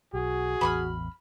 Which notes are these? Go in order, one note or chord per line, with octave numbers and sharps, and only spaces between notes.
B1 F#4 G#4
A1 E2 B5 C#6 F6